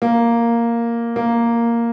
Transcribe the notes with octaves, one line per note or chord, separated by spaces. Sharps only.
A#3
A#3